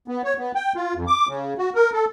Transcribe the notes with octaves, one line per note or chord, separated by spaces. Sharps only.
B3
C#5
B3
G5
F4
F2
D6
C#3
F#4
A#4
A4